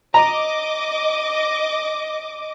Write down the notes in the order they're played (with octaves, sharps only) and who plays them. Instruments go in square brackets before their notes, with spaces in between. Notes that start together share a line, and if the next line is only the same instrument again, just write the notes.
[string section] D#5 D6 [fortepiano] A#5